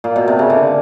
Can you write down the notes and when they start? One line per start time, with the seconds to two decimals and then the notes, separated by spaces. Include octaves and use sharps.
0.04 A#2
0.16 B2
0.28 C3
0.39 C#3
0.50 D3